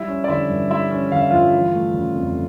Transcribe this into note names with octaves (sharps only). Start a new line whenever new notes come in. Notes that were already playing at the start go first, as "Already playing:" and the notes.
Already playing: G3 E4 E5
C#4
D5
D3 E4 E5
G2
G3 E4 E5
C#4
D3 F5
E5
G2 F4 F5
E3
A3
C#3
F2